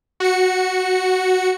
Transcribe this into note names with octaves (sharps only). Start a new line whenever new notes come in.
F#4 C#7